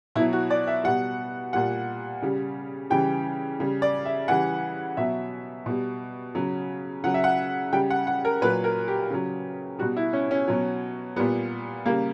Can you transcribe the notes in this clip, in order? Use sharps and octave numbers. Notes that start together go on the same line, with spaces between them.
B2 F#3 E4
F#4
D5
E5
B2 G3 F#5
A#2 G3 F#5
C#3 G3
C#3 E3 G3 G5
C#3 G3
D5
E5
C#3 E3 G3 F#5
B2 F#3 E5
B2 G3
C#3 F#3
C#3 F#3 F#5
E5
F#5
C#3 G3 G5
F#5
F#5
A#4
A#2 F#3 B4
A#4
G4
C#3 F#3
B2 G3 F#4
E4
C#4
C#4
B2 F#3
A#2 G3 B3
C#3 G3 A#3